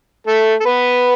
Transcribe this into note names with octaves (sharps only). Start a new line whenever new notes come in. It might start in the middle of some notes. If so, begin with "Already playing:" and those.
A3 A4
A4
B3 B4